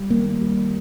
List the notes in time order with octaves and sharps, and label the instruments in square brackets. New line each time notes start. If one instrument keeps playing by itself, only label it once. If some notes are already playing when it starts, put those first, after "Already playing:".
Already playing: [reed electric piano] G3
[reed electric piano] D#3 [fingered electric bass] A#3
[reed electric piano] G3